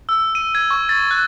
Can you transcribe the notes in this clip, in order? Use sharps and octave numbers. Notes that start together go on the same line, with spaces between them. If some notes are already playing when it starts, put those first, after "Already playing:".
E6
D#7
G#6
C#6
A6
F#6